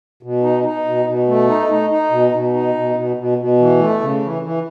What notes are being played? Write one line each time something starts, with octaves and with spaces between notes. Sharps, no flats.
B2
D#4
D#4
B2
B2
A3
D#4
D#4
D#4
B2
B2
D#4
B2
B2
B2
B2
E3
A3
C#3
E3
E3